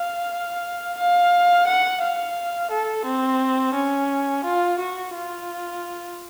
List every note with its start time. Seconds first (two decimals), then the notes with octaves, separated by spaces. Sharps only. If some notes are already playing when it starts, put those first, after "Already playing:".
Already playing: F5
0.97 F5
1.66 F#5
2.01 F5
2.70 A4
3.05 C4
3.74 C#4
4.44 F4
4.79 F#4
5.14 F4